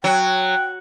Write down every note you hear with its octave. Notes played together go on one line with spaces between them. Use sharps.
F#3 G5